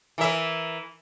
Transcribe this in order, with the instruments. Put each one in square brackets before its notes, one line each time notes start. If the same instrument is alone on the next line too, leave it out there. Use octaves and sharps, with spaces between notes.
[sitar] E3 A#4 E5